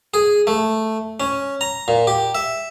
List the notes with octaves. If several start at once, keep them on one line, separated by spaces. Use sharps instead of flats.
G#4
A3
C#4
A#5
A#2
G4
E5